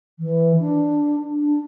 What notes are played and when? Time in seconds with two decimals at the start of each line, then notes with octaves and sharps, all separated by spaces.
0.19 E3
0.60 D4
1.35 D4